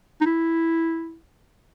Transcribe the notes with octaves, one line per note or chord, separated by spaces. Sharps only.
D#4
E4